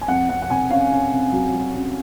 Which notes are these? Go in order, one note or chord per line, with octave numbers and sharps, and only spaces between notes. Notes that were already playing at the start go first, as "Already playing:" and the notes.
G#5
F2 F#5
F2 F#5
F#5
C3 G#5
C#4 F5
C#4
C3
F#3
F#3
C#4